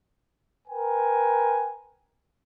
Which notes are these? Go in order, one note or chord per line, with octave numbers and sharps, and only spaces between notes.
A#4 B4 G5 G#5